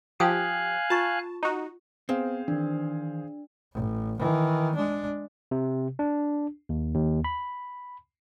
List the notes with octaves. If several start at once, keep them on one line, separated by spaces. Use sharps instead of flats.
F3 G4 F5 G#5 D#6 F#6
F4 A5 C#6
D#4 F#4
B3 C4 G#4 C5 F5
D#3 E3 D4
A1
D#3 E3
G#3 D4
C3
D4
D#2
D#2
B5